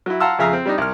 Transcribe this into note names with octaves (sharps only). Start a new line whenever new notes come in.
F#3 E4
F5 F#5 A5 A#5 C6 E6
F2 C#3 G#4 E5 F5 A#5
C4
G3 D4 D#4
C2 F6